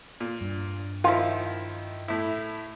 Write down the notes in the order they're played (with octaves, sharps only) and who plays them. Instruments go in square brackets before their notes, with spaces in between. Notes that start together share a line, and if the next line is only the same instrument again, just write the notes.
[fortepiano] A#2
[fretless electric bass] G2 D4
[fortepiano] D#3 F3 E4 [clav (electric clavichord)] F4
[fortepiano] A2 E4